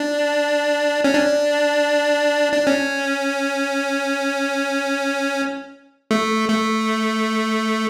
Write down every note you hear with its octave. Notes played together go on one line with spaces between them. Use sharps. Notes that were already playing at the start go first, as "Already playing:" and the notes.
Already playing: D4
C#4
D4
D4
C#4
A3
A3